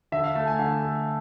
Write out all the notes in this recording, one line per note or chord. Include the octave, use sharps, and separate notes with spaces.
D3 E5
F5
A3 A5
G#5
D3 F5
A3